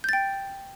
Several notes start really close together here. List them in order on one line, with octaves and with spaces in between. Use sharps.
G6 A6 G5